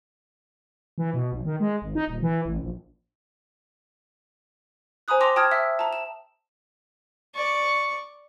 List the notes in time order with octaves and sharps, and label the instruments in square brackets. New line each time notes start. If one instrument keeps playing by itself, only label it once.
[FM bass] E3
B2
B1
D#3
G#3
G#1
D#4
D#1
E3
A1
A#1
[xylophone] C5 G#5 A#5 B5 D#6 F#6
G5 A5 C6 D6 A#6 F7
G5 A5 D#6 F6 G#6
E5 E6 B6
A5 A#5
E7
[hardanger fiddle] D5 C#6